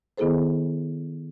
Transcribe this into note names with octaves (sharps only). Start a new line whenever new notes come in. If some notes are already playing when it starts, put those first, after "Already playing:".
D#3 B3 E4 G#4 A4 C5